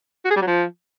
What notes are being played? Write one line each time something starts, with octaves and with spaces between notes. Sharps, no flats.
F#4
G#4
G3
F#3
F3